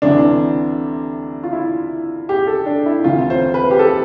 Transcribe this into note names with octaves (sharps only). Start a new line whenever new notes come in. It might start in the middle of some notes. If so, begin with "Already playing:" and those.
D2 C3 E3 D4
F4
E4
G4
A4
D4
E4
D2 C3 E3 F4
C5
B4
G4
A4